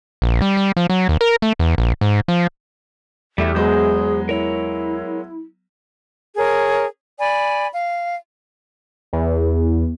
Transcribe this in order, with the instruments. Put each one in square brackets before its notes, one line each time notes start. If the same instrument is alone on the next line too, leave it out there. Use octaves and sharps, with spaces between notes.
[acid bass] A#1
G3
G3
F3
F#3
D#2
A#4
A3
E2
A#1
G#2
F3
[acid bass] E2 [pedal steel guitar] G3 A3 E4 [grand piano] G4
[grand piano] F#3 G#3 B3 [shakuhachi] G#4 [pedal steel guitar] C5 G6
[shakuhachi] E4 [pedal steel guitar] A#4 C#5
[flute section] G#4 A#4 C#5
D5 G#5 B5
F5
[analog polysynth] E2